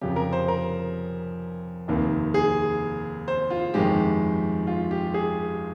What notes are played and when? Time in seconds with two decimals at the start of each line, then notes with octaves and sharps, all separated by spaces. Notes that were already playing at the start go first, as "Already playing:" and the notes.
0.01 F1 F2 C#3 G4
0.16 A#4
0.33 C5
0.48 A#4
1.88 F1 D#2 D#3 A#3
2.34 G#4
3.28 C5
3.51 F4
3.74 G1 F2 D#3 G#3 G4
4.67 F4
4.91 G4
5.14 G#4